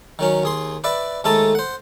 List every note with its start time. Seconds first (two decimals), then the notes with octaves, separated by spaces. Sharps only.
0.19 D#3 F#3 C#4
0.43 D#2 G#4 C6
0.84 B4 D5 E5
1.24 D#2 G#3 A3 A4 A5 A#5
1.55 C5 F#5